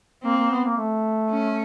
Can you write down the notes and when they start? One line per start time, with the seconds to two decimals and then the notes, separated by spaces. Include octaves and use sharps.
0.24 A#3 C4
0.37 A#3
0.51 B3
0.64 A#3
0.77 A3
1.30 C#4